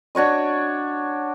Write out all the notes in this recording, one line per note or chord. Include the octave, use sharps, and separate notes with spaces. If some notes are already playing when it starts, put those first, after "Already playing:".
D4 F#4 C#5 D#5